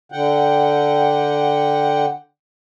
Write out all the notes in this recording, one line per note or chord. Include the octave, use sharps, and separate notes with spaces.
D3 F#5 G5